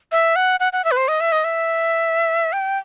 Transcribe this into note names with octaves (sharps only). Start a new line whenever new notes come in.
E5
F#5
F#5
F#5
E5
B4
C5
D#5
E5
D#5
E5
G5